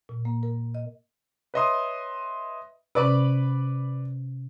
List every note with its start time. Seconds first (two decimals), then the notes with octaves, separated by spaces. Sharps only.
0.09 A#2
0.25 A#3
0.43 A#4
0.75 D#5
1.54 B4 C#5 D#5 E5 C6 D#6
2.95 C3 C#4 B4 D5 B5